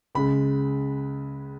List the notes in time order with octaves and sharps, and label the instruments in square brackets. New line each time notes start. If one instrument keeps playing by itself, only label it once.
[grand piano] C#2 C#3 G#3 B5